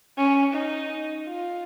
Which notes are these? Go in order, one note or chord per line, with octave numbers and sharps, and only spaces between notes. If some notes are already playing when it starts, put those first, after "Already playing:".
C#4
D#4
F4